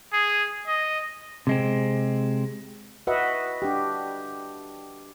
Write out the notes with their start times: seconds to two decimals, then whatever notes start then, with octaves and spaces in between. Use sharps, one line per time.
0.13 G#4
0.67 D#5
1.47 C3 G#3 C4
3.07 F#4 B4 D#5 E5 F#5
3.62 D4 G4